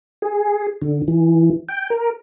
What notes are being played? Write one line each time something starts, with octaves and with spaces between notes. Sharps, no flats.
G#4
D3
E3
G5
A#4